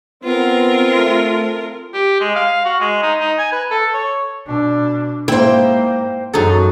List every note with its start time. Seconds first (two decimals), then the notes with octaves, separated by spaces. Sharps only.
0.24 B3 C4 F4 A#4
0.97 A3
1.94 G4
2.21 G#3
2.36 F5
2.65 F#4
2.81 G#3
3.03 D#4
3.20 D#4
3.38 G#5
3.52 B4
3.71 A4
3.94 C#5
4.46 B2 D4
5.28 G#2 A#3 E4 C5 G5
6.33 F#2 F#3 D#4 G#4 A4